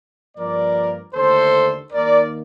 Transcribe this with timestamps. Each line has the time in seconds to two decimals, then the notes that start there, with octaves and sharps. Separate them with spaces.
0.36 G2 F3 A#3 A#4 D5
1.14 D#2 D3 A3 A4 C5
1.92 D#2 D#3 A#3 A#4 D5